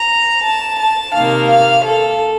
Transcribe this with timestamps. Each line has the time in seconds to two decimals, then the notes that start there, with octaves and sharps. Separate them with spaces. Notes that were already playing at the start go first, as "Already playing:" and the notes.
Already playing: A#5
0.44 A5
0.79 A5
1.14 C3 D#3 A#3 F5
1.49 F5
1.84 A4